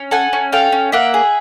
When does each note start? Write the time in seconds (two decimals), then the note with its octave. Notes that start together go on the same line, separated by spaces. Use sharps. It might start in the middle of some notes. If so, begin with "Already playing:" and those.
Already playing: C#4
0.11 A4 F#5 G#5
0.33 C#4
0.52 A4 F5 G5
0.72 C#4
0.92 A#3 E5 F#5
1.14 G#4